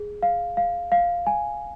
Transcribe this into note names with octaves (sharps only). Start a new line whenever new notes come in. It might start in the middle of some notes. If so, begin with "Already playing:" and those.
Already playing: G#4
F5
F5
F5
G#5